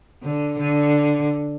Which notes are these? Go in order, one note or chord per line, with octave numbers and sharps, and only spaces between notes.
D3
D3